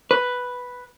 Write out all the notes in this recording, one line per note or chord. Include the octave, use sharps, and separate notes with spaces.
B4